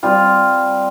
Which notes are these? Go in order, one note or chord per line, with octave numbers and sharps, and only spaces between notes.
G3 C4 F4